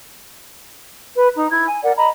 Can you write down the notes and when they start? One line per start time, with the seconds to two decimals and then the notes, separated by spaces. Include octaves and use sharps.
1.15 B4
1.36 D#4 A#5
1.51 E4 G#6
1.67 G#5
1.84 A#4 D5 F#5
1.96 D#5 A#5 B5